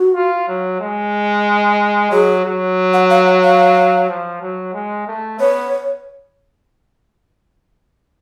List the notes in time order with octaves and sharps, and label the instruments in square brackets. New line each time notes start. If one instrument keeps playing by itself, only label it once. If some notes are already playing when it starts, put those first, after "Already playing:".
Already playing: [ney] F#4
[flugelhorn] F4
F#3
G#3
[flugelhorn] F#3 [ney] G#4
[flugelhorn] F#3
[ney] F#5
F5
F#5
F5
[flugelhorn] F3
F#3
G#3
A3
[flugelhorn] B3 [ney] C#5